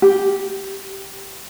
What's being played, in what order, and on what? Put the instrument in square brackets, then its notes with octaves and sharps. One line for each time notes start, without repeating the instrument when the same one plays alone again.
[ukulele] G4